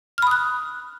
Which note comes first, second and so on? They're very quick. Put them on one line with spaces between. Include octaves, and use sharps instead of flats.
F6 B5 D#6 F#6